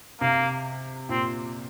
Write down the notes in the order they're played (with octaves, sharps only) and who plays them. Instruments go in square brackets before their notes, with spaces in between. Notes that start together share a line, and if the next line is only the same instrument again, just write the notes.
[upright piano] C3 [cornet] A#3
[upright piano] A#2 [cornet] C4